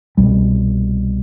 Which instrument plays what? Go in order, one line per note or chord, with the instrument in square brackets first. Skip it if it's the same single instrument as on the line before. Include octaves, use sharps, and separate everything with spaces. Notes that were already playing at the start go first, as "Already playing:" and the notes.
[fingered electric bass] C2 B2 G3